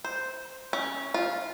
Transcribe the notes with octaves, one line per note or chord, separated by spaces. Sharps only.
C5
C#4
F4